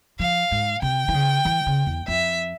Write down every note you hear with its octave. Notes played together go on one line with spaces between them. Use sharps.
F3 F5
G#2
C3 G5
E3
C#3
E3
C#3
E2
F2 E5